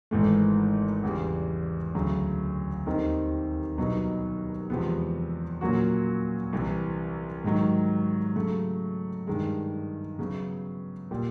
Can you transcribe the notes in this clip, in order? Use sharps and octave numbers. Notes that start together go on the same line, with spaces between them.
G#1 G#2 E3 A3
E2 C#3 E3 G3
D2 C#3 F#3
D#2 D#3 G3 C4 D#4
C2 B2 F#3 B3 D#4
E2 C3 F3 G#3 B3
A#2 F#3 A#3 C#4 F#4
C2 C3 E3
G#2 D#3 F#3
C#3 F#3 A3
G2 D#3 G#3
C#3 F#3 B3
A#2 G3